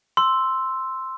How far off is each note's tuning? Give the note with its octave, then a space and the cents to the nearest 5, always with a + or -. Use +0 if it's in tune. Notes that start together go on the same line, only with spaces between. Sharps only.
C6 +0 E6 +0